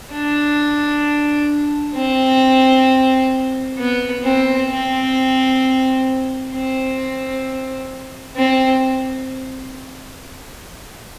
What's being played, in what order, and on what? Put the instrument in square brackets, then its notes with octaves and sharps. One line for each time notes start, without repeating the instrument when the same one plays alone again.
[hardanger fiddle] D4
C4
B3
C4
C4
C4
C4